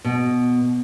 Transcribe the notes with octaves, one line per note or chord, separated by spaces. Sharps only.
B2